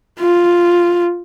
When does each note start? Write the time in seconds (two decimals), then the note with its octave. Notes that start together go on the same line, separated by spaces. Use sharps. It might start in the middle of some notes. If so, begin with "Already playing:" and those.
0.20 F4